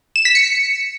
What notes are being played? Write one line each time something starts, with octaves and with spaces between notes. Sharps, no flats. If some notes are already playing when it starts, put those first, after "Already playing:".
E7
B6
C#7